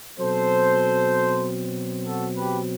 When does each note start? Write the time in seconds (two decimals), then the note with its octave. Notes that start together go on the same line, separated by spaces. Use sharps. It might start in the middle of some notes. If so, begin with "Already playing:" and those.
0.19 B2 F#3 C4 A4 C5
2.06 F#4 A4
2.37 G4 B4